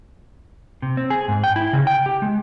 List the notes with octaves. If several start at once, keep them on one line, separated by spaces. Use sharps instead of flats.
C3
C4
G#4
G#2
G5
E4
C#3
G5
G4
G#3